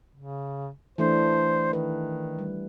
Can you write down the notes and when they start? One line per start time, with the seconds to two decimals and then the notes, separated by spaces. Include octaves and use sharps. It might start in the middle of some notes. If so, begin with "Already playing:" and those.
0.15 C#3
0.98 E3 A3 D4 C5
1.73 D#3 B4
2.39 G3